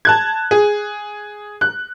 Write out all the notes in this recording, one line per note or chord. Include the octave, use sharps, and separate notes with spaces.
A5 F#6 G#6
G#4
F#6